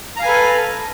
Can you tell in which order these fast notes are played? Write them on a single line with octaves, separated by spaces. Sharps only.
A#5 F5 G#5 B4 A4